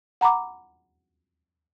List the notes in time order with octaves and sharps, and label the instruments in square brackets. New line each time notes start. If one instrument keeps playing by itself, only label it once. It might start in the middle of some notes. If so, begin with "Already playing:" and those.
[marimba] F#5 A#5 B5 D6